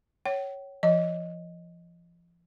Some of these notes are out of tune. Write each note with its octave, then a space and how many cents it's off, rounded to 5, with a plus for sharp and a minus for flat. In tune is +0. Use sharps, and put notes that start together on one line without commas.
C#5 +0 G5 -45
F3 -35 D#5 +0